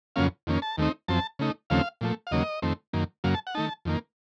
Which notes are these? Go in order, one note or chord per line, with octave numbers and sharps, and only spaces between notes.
F2 C#3 F#3 A#3 C#4 F5
F2 D#3 A#3 C#4
A5
D#2 D#3 A3 C4 D#4
F#2 F3 C4 A5
C#3 A3 D#4
D#2 C#3 F3 A3 C4 F5
A#2 F3 A3
F5
D#2 C#3 F#3 A#3 D#5
F2 D#3 A3 C4
F#2 D#3 A#3
F#2 C#3 F#3 A#3 F5
A5
F#5
D#3 A3 D#4 A5
F2 D#3 A#3